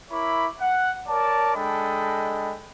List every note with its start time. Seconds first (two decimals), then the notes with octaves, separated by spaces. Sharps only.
0.11 E4 A#4 C#5 E5 B5 D6
0.59 F#5
1.08 A#4 C#5 D5 A5
1.55 G#3 D4 A4 D#5 G5 B5